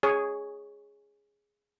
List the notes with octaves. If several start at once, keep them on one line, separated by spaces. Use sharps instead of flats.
G#4 C#5